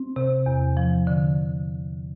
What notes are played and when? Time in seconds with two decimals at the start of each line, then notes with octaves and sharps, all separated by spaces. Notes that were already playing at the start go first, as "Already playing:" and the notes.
Already playing: C4
0.16 C3
0.46 E2
0.77 F3
1.07 D3